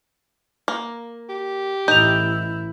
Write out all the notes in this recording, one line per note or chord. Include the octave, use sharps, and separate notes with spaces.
A#3
G4
A1 D#4 E4 G6 F7